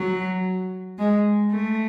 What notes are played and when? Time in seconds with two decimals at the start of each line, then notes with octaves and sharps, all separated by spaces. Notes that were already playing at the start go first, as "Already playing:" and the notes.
Already playing: F#3
0.99 G#3
1.51 A3